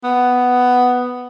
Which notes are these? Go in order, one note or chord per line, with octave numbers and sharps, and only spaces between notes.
B3